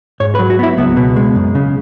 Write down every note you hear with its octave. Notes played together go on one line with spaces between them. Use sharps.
G#2 C#5
B4
F#3
F#4
B3 E4
C#2 B3
B2
G#3
F#2
C#3